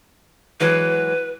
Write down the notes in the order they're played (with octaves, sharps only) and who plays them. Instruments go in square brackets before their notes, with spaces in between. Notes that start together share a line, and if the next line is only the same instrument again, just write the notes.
[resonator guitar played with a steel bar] E3 F#3 G#3 [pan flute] B4